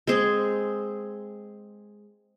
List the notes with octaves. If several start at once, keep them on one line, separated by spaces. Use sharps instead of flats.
G#3 C4 G#4